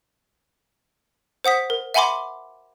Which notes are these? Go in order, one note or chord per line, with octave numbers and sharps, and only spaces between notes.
C5 F#5 D#6 B6
A#4
E5 F#5 G#5 B5 C6 D6